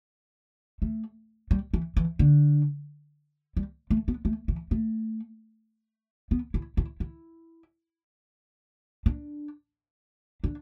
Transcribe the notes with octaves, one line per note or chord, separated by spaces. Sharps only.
A3
G3
E3
E3
D3
G3
A3
B3
A3
E3
A3
B3
E4
E4
E4
D4
D4